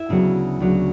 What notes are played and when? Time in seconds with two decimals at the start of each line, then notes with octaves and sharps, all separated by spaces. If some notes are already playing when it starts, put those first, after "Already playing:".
Already playing: E4 E5
0.09 D2 C#3 F#3 B3
0.60 D2 C#3 F#3 B3